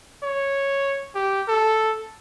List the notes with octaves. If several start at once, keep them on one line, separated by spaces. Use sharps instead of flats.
C#5
G4
A4